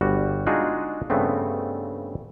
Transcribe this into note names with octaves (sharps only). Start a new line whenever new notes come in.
G1 G3 F#4
G#3 D4 D#4 F4 F#4 G#4
G2 C#3 A3 B3 C4